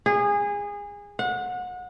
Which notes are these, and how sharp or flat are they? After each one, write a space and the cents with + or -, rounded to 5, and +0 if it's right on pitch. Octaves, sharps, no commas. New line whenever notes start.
G#4 -25
F#5 -30